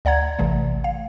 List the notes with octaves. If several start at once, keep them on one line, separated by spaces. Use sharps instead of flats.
D2 D5 F#5 A#5 G#6
A1 C3 E3 A3
F5